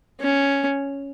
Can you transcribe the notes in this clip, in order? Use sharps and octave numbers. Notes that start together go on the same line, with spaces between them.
C#4